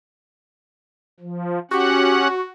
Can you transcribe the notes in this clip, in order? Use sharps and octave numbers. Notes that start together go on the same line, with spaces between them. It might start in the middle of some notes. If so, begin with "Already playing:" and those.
F3
C#4 F#4 G4 F#5